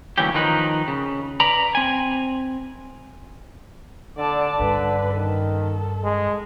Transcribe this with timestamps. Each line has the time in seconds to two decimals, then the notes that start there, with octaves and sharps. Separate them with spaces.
0.18 D2 E3 F#3 A#3 C#4 G4
0.34 D#3 F3 D#4 B4
0.88 C#3
1.40 B4 D5 A#5 B5
1.75 C4 G#5
4.17 D3 D5 A5
4.59 G2 D3 C#4 B4
5.16 D#3 A4
6.04 G#3